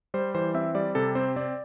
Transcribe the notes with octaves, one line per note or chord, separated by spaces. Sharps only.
G3 C5
E3 C5
C4 E5
G3 D5
C3 A4
C4 C5
C4 D5